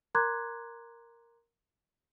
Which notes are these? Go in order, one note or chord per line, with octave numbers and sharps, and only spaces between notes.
A#4 A#5 C6 D6 F#6 G#6